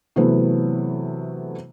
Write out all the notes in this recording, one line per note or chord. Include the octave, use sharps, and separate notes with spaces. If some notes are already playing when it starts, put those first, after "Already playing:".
C3 E3 F#3 A3 B3